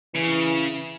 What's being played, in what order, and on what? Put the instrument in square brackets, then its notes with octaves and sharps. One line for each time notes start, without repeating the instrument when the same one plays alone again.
[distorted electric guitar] C#3 [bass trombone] E3